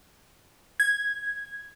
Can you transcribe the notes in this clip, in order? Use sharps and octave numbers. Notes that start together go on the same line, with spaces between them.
G#6